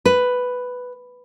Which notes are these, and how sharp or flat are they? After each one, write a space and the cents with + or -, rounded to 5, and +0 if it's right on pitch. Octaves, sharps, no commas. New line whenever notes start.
B4 +5